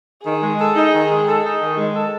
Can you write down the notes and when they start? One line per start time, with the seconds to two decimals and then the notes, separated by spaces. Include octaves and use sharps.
0.24 D#3 G#4
0.41 G#3
0.58 A4
0.76 D#4
0.93 D#3
1.10 G#3
1.27 A4
1.44 D#4
1.61 D#3
1.77 G#3
1.95 A4